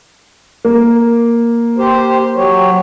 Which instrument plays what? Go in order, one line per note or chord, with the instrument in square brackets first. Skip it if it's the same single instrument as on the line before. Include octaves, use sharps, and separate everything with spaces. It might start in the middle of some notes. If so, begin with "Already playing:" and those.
[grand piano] A#3
[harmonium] G4 C5
F#3 G4 C#5